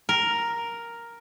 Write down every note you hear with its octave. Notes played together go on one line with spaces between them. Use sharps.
A#4